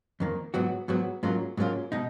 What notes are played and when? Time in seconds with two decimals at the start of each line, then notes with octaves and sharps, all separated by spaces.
0.20 F2 D#3 A#3
0.54 G#2 F#3 B3 F#4
0.88 G#2 F#3 B3 F#4
1.23 G#2 F#3 A#3 C#4 F4
1.57 G#2 F#3 A#3 C#4 F4
1.92 B2 G#3 D#4